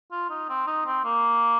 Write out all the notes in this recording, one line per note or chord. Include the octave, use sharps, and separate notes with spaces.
F4
D#4
C4
D#4
C4
A#3